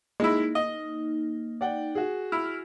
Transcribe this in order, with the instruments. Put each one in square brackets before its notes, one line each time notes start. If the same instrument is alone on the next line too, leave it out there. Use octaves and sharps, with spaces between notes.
[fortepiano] G#3 E4 [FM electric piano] A#3 D#4
[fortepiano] D#5
[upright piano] D5 F#5 G5
F#4 G#4
[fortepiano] E4 [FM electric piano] F6